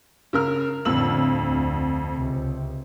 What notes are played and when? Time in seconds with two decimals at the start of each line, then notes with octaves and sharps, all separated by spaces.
0.33 C#3 A#4 F6
0.85 F2 A2 D3 E6 F#7
1.30 D2
2.13 C#2 C3